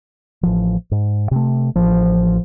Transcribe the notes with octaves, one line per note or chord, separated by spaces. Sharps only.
A1 F3
G#2
C3 A3
A1 F3